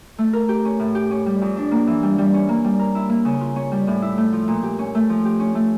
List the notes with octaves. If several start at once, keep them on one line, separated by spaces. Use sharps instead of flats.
A3
A#4
G4
C#4
A2
G4
C#4
G3
F2
D4
A#3
E3
G3
G3
C#4
A#3
G3
A#4
E4
A#3
C#3
F4
C#4
G3
A2
E4
A3
F3
A#2
G4
C#4
A3
F3
G4
C#4
A3